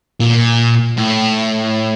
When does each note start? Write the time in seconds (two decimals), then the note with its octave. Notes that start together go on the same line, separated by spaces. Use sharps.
0.20 A#2
0.98 A2